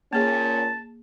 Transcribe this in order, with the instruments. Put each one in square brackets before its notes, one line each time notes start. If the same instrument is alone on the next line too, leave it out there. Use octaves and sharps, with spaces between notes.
[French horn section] A#2 C#4 [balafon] A#3 G#4 [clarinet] A5